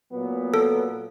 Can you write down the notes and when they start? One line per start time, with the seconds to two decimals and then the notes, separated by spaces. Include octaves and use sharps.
0.12 A#2 F#3 B3
0.54 A4